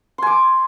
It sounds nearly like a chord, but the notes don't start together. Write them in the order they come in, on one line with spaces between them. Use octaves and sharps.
C6 G#5 D6